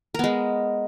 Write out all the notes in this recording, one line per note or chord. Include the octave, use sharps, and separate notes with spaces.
G#3 B3 A#4